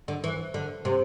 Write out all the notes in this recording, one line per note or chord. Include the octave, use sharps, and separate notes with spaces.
D3
E3
D3
C3